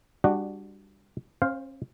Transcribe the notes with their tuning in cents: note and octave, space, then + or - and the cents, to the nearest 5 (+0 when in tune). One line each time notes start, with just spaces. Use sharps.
G3 +20 D4 +10 F#4 +0
C#4 -40 C5 +0 F5 +0